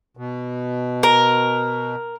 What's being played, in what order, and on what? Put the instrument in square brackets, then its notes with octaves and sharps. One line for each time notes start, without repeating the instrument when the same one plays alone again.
[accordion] B2
[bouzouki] A#4